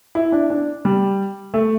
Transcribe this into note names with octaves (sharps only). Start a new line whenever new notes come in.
E4
D4
D4
G3
A3